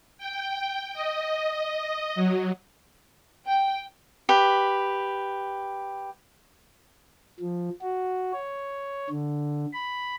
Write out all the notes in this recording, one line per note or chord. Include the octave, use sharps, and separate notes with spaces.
G5
D#5
F#3
G5
G4 B4
F3
F#4
C#5
D3
B5